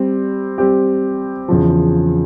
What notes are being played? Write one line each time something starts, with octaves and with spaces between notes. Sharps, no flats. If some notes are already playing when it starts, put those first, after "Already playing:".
Already playing: G3 C4 G4
G3 C4 G4
E2 C#3 F3